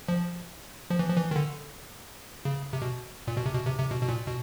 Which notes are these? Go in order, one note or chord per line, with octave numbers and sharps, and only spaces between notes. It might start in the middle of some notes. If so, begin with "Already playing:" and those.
F3
F3
E3
F3
E3
D#3
D3
C#3
C3
B2
A#2
B2
C3
B2
C3
C3
B2
B2
A#2
B2